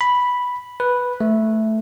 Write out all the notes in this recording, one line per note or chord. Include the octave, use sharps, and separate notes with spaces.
B5
B4
A3